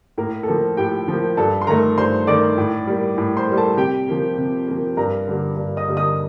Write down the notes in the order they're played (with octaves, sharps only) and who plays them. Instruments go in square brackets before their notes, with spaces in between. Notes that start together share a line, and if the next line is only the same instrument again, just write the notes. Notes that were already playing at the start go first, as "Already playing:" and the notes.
[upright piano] A2 A#3 A#4
A4
F3 A#3 A#4
A2 G4 G5
F3 A#3
G2 A4 A5
C6
D#3 A3 A#4 A#5
G2 C5 C6
D#3 A3 D5 D6
A2
G3 A#3
A2
C5 C6
G3 A#3
A4 A5
C3 G4 G5
F3 A#3
C3
F3 A#3
G2 A#4 A#5
D3 G3 A#3
G2
D#5 D#6
D3 G3 A#3
D#5 D#6